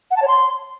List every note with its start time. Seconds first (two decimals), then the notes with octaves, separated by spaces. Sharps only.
0.11 F#5
0.17 A5
0.22 C#5
0.28 C6